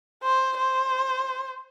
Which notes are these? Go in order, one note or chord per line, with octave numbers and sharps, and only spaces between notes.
C5
C5